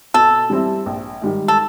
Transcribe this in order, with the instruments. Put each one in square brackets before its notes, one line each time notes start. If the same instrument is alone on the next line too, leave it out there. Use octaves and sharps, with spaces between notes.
[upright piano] B2 [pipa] A4
[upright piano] G3 C4 E4
A#1
G#2 D#3 G3
[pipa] A4